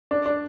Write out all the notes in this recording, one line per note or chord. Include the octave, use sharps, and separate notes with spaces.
D4
D4